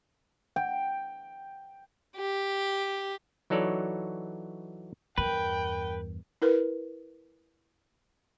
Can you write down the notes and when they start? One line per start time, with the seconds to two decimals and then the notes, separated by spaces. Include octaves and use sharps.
0.56 G5
2.16 G4
3.50 E3 F#3 D#4 A4 C#5 D5
5.18 E2 G2 A#4 B4 G5
6.42 E4 A#4 B4